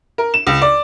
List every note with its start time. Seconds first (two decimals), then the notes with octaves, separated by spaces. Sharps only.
0.18 A#4
0.34 E7
0.47 C#2
0.62 D5